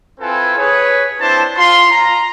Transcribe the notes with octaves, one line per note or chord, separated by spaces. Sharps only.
C4 E4 F4 A4 B4 G#5
G#4 B4 C#5
C4 D4 E4 C5 A5
F4 C6
A#5